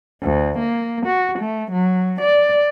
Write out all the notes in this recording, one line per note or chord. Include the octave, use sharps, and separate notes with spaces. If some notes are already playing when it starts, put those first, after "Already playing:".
D2
A#3
F#4
A3
F#3
D5